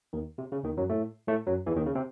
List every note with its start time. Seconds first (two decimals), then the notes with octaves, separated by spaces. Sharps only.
0.13 D#2 D#3
0.38 C3
0.52 C#3
0.64 D#2 D#3
0.77 F#2 F#3
0.89 A2 A3
1.28 A2 A3
1.47 F#2 F#3
1.66 E2 E3
1.76 D#2 D#3
1.86 C#3
1.95 C3 C4